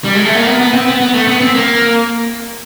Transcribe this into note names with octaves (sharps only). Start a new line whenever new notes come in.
G3
G#3
A3
A#3
B3
B3
C4
B3
B3
A3
B3
C4
A#3